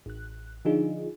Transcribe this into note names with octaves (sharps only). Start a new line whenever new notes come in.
A1 F#6
D3 F3 D4 D#4 F4 G#4